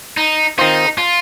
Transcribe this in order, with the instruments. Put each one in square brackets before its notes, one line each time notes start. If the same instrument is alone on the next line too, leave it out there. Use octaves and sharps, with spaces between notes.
[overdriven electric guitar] D#4
[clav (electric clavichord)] D#3 C4 F4 C5 [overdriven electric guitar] D#4
[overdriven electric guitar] F4